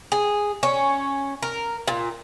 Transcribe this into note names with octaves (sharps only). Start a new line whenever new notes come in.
G#4
C#4
A#4
A#2